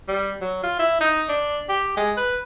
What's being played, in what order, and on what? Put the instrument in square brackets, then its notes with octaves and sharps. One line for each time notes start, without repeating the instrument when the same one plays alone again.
[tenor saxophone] G3
F#3
F4
E4
D#4
D4
G4
G#3
B4